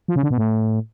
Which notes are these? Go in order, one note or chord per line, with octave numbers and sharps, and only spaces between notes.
F3
C#3
D3
B2
A2